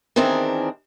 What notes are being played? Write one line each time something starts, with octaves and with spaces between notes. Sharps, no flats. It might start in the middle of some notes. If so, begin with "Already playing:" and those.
D#3 E3 C4 D4 G#4 A#4